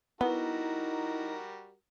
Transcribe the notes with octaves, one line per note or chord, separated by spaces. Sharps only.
G3 B3 D#4 E4 F#4 A#4